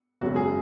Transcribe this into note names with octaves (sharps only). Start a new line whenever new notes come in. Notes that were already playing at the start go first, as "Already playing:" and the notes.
F#1 F#2 C#3 G#3 F#4
G#4